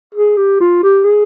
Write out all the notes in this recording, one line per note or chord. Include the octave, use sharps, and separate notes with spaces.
G#4
G4
F4
G4
G#4